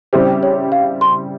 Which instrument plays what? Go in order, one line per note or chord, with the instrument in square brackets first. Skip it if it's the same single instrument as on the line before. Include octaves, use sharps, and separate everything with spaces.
[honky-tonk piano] C#3 G3 C4 E4 G4 [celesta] C5
[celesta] C#5
F5
C6